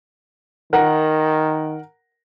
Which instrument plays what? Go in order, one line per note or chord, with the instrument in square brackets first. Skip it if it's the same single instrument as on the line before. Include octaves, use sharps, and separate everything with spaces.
[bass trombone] D#3 [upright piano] A#4 F#5 A#5